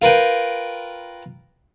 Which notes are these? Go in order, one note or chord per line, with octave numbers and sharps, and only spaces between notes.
F4 A#4 B4 G5